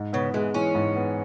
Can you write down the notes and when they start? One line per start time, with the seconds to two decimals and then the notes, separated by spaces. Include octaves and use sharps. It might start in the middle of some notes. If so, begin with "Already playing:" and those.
Already playing: G#2
0.13 C#3 B3
0.34 E3 G#3
0.54 E3 C#4
0.75 G#2
0.96 B3